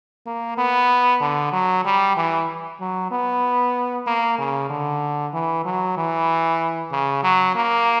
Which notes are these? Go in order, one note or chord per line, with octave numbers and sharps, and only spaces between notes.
A#3
B3
D3
F#3
G3
E3
F#3
B3
A#3
C#3
D3
E3
F#3
E3
C#3
F#3
A#3